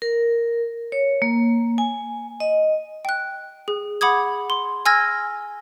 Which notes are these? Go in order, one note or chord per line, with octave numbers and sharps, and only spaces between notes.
A#4
C#5
A#3
G#5
D#5
G5 F#6
G#4
F#5 B5 D6 D#6 G#6
C6
G#5 E6 F6 G#6 A#6